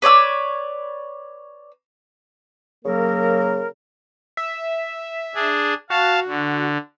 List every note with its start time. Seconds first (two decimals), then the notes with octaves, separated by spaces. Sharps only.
0.02 B4 C#5 D5 E6
2.85 C#3 F#3 A#3 A#4
4.37 E5
5.35 D4 G#4
5.90 F#4 F5 A5
6.27 D3